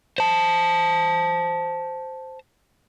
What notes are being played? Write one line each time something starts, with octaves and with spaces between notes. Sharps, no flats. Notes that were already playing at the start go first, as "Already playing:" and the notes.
C5 A5